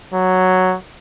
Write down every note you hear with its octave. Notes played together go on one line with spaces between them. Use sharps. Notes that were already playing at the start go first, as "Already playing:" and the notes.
F#3